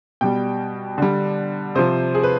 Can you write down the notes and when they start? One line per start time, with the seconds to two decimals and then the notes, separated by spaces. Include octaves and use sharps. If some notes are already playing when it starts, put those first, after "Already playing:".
0.21 B2 G3 G5
0.98 D3 G3
1.75 C3 F3 C5
2.15 G#4
2.23 B4